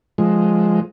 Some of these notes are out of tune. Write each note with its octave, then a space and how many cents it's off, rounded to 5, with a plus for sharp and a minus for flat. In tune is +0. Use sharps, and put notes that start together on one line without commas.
F3 +0 G#3 +0